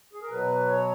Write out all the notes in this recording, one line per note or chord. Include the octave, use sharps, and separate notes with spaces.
G#4
A#4
B2 F#3 B4
C#5